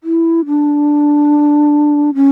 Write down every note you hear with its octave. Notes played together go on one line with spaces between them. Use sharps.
E4
D4
C#4